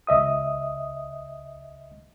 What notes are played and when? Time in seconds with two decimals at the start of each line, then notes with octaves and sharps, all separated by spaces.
0.07 C#2 D#5 E5 D#6